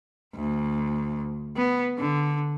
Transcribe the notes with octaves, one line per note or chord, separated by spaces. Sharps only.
D2
B3
D3